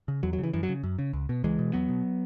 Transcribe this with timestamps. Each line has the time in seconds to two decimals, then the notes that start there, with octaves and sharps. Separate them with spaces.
0.08 C#3
0.23 E2 F#3
0.33 F#3
0.39 C#3 E3
0.53 F#2 E3
0.63 F#3
0.69 C#3
0.83 F#2
0.99 C#3
1.13 C#2
1.29 B2
1.44 C#2 E3 G#3
1.59 B2
1.73 E2 F#3 B3
1.89 B2